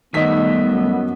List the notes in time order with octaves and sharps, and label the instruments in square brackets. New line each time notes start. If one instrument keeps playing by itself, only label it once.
[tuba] D#3 [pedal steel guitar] G3 A3 E5 [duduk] B3 [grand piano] D#5 B6
[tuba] F#2